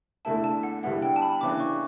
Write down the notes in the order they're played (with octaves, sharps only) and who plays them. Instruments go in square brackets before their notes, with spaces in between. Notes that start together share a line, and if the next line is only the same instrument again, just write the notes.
[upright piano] E2 D3 A3 E4 [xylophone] A5
[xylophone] A5
F#5
[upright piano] E2 D3 G3 B3 E4 [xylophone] F#5
[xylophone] G5
A5
B5
[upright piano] C#3 E3 B3 D4 [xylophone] D6
[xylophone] C#6